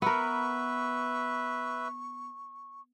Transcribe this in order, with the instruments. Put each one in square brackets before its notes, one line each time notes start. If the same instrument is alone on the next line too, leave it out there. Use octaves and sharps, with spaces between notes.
[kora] B3 A#4 [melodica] B4 E5 [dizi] C#6